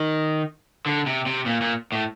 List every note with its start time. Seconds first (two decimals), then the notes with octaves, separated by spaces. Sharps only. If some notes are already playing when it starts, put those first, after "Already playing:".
Already playing: D#3
0.86 D3
1.07 C3
1.26 C3
1.46 A#2
1.61 A#2
1.92 A2